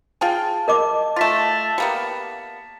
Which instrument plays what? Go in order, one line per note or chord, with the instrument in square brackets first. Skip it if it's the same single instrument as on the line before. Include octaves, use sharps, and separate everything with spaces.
[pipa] F4 G#4 G5 [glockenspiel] A5
[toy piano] A#4 D#5 D6
[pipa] A3 F4 [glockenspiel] A6 B6 E7
[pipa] G3 A#3 B3